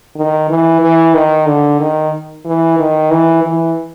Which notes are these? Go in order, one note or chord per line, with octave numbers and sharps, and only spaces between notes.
D#3
E3
E3
D#3
D3
D#3
E3
D#3
E3
E3